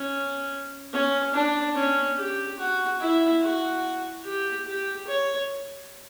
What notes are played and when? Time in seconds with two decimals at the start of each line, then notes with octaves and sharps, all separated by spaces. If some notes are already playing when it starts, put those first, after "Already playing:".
Already playing: C#4
0.93 C#4
1.34 D4
1.75 C#4
2.17 G4
2.58 F#4
3.00 E4
3.42 F#4
4.24 G4
4.66 G4
5.07 C#5